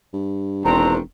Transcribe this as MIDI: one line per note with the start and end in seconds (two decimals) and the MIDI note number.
0.13 0.62 43
0.65 1.00 28
0.65 0.98 51
0.65 0.98 60
0.65 0.98 62
0.65 0.94 82